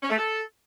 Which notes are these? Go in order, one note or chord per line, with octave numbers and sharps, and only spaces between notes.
C#4
A3
A4